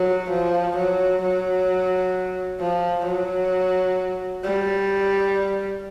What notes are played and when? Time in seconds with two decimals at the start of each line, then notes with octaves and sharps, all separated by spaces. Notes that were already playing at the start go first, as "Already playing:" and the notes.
Already playing: F#3
0.31 F3
0.77 F#3
1.22 F#3
2.60 F3
3.06 F#3
4.44 G3